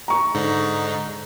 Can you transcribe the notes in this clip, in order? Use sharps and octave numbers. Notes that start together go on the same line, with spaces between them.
A#5 C#6
G#2 D3 D#4